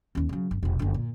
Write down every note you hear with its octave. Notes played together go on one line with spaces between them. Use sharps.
D#2 C#4
C#3 F#3
G1
E1 A#1
F#1 D3
A#2